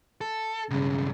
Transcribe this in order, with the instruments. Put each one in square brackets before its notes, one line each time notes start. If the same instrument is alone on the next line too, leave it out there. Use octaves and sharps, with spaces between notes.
[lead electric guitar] A4
[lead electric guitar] B1 G2 [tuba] C#3